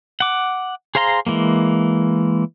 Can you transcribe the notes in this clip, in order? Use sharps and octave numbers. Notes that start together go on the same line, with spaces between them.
F#5 D6
G#4 C5 F5 A#5 C6
E3 G#3 A#3